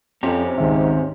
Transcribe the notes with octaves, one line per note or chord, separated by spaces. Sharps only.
F2 C4 C#4 G4
C#2 G#2 D#3 E5